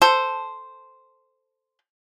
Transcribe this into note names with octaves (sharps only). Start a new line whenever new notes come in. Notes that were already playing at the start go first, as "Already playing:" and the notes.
A4 C5